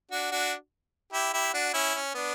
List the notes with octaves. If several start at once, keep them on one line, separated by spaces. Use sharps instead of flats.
D4 F#4
D4 F#4
E4 G4
E4 G4
D4 F#4
C#4 E4
C#4
B3 D4